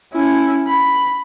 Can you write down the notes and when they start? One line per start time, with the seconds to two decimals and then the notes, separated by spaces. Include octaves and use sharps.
0.13 C#4 E4
0.67 B5